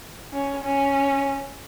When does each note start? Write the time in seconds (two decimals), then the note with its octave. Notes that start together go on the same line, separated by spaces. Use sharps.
0.33 C#4
0.64 C#4